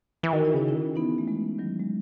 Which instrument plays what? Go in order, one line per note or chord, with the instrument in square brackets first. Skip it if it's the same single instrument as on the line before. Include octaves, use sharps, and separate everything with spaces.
[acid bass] E3
[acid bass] D#3 [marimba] F#4
[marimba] E4
[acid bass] C#3 [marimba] D#4
[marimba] C#4 E4
[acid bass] D#3
[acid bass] E3 [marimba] B3 D#4
[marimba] A3
G#3 B3
D#3 F#3
G#3